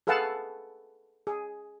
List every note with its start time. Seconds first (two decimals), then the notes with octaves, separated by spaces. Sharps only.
0.07 G#4 A4 B4 F5 F#5 A5
1.27 G#4